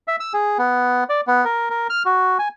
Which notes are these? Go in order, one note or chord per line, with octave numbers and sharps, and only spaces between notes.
E5
E6
G#4
B3
D5
B3
A#4
A#4
F6
F#4
G#5